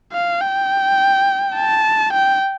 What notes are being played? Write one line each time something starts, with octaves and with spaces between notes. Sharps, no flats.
F5
G5
A5
G5